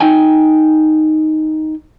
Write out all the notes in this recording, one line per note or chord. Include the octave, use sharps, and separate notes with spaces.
D#4 G5 G#5